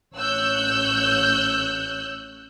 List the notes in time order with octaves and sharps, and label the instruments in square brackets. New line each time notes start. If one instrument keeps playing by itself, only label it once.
[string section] A1 C#5 E6 F#6 G6